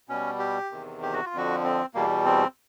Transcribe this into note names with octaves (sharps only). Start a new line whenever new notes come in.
B2 G3 C#4
G4
E2 C3 D#3
G4
F#4
F4
F2 D3 F3 F#4
C4
E2 B2 G3 A#3
C4